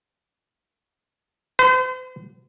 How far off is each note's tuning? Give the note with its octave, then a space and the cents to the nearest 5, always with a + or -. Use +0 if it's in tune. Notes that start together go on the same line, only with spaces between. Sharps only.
C5 -45